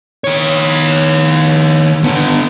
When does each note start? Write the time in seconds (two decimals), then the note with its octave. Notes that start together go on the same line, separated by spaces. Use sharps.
0.24 D#3 C#5
2.03 D3 B3